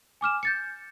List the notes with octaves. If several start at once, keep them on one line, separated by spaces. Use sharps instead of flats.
G#5 D6 F6 E7
G6 A6 C#7